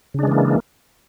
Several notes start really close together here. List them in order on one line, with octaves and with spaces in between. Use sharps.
C#3 D4 G#3 E3 A#3